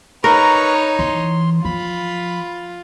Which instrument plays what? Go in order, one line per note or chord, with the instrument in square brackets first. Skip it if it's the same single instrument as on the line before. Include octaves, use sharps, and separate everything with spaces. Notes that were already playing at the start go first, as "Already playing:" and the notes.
[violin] D#4 C#5 [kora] A#4 [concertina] B4 A#5 C#6
[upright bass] E3 [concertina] C6
[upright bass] F3 [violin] F4 [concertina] B5